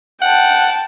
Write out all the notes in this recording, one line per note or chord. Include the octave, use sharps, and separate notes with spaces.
F#5 G5 A5